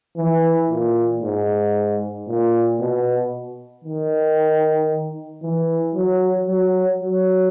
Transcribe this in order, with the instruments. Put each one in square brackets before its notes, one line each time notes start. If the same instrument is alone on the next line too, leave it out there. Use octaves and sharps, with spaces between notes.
[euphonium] E3
A#2
G#2
A#2
B2
D#3
E3
F#3
F#3
F#3